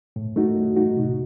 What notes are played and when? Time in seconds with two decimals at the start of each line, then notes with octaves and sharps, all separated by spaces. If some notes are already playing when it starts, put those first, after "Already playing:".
0.16 A2
0.36 A3 D#4 F#4
0.56 A2
0.76 A3 D#4 F#4
0.97 C3